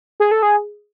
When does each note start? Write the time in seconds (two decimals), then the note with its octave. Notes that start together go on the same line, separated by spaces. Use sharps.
0.20 G#4
0.31 A4
0.43 G#4